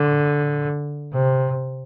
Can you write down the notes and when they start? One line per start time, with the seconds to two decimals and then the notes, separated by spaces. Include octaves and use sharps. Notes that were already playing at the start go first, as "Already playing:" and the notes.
Already playing: D3
1.13 C3